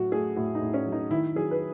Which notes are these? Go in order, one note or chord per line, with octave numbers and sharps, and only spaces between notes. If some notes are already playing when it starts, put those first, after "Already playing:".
Already playing: A2 F#3 F#4
A3 G#4
A2 F#4
D#4
A2
C#4
F#3
D#4
D#3 E4
F#3 G#4
B4